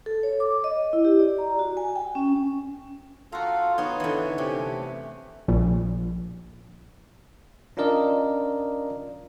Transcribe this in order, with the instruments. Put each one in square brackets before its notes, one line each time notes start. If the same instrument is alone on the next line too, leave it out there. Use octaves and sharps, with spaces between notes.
[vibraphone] A4
C#5
D6
D#5
E4
G4
D5
A#5
F#4
G#5
G5
C#4
[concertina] F4 A4 F5 [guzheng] F#4 A#5
[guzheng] B3 D#4 [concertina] C#5
[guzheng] D3 E3
[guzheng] C3 [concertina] C#4 G4
[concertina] A3
[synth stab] A#1
[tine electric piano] C#4 D4 F4 A#4 D5 D#5